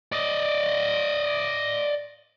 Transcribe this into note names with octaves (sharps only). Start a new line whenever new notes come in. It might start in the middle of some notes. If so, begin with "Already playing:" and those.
D5 D#5